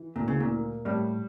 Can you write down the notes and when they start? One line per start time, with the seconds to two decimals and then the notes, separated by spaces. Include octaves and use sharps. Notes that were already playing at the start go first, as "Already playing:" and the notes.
Already playing: E3
0.16 D2 A#2
0.28 C#3
0.40 A#2
0.50 A#3
0.85 A2 G3